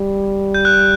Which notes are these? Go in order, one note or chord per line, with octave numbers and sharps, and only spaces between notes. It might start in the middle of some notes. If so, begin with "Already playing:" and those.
Already playing: G3
G6
F#6